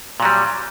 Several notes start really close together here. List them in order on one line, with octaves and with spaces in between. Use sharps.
A#2 F#3 G3